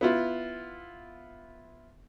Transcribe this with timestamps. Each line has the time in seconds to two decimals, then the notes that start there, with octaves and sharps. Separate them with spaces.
0.01 B3 E4 F4